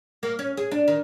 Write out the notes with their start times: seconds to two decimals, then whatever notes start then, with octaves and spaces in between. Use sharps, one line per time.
0.23 A#3
0.39 C#4
0.57 G#4
0.71 D4
0.88 D#3